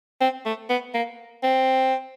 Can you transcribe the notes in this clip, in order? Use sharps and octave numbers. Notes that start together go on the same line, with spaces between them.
C4
A3
B3
A#3
C4